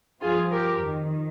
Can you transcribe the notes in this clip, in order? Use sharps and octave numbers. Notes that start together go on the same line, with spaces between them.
G2 F3 F4 G#4
G4 A#4
F2 D#3